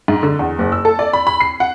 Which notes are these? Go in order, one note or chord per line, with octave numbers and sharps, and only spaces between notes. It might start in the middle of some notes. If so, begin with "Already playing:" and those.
G#2
D3
E2
F#1
E6
A4
D5
B5
B5
C7
F#5